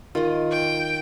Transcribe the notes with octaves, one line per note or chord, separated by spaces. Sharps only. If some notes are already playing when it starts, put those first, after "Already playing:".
D#3 F4 D#5
G5